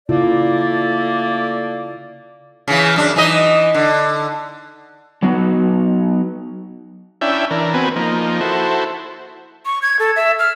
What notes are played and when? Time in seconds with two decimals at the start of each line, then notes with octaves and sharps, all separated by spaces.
0.09 C#3 A3 A#3 E4 F4 D5
2.68 C#3 E3
2.96 F#2 D4
3.16 E3 D#4 D#5
3.74 D3
5.23 F#3 B3 D#4 F#4
7.21 C#4 D4 E4 E5 G5
7.51 E3 D4 A#4
7.74 B3 C4 F#4 B4 G#5
7.96 F3 A#3 D#4
8.41 E4 F#4 A4 C5
9.66 C#6
9.82 G#6
9.99 A4
10.16 E5
10.39 F6